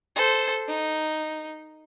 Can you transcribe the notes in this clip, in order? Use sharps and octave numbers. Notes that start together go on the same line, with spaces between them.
A4 C5
D#4